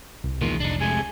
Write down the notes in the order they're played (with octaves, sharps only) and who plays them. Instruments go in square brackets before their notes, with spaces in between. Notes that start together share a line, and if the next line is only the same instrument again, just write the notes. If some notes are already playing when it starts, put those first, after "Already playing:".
[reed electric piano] C2
[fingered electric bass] E2 A#2 [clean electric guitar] D#3 G#3 F4
[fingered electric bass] F1 [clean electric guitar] D4 D#4
[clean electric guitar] C3 G#3 A3 [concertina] G#5